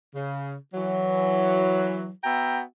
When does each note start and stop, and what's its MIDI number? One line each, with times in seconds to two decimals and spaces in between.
0.14 0.55 49
0.74 2.09 52
0.74 2.09 54
2.24 2.61 59
2.24 2.61 66
2.24 2.61 76
2.24 2.61 79
2.24 2.61 82